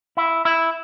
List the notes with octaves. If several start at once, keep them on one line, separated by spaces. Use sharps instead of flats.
E4
E4